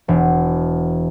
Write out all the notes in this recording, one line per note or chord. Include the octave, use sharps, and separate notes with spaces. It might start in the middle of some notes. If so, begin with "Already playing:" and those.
E1